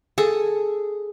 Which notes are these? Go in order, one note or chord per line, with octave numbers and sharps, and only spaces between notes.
G#4 A4